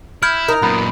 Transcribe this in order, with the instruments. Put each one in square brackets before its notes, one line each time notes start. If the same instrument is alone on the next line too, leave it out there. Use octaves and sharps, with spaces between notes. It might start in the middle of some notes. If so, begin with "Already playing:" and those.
[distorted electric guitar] E4 [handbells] F6 G6 G#6
[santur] D#4 [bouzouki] A#4
[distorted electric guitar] F#2 A#2 [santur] B3